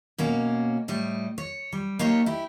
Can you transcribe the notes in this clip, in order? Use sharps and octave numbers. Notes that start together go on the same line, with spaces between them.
B2 A#3 C#4 F#4
A2 G3 D#5
C#5
G3
A#3 D#4 G4 C#5
E4 G4